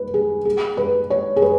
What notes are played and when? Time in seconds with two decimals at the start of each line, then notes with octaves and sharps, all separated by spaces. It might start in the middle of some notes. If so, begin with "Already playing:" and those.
Already playing: B4
0.14 G#4
0.45 G#4
0.77 B4
1.10 C#5
1.36 G#4
1.42 B4